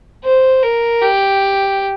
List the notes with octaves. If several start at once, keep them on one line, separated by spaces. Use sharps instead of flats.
C5
A#4
G4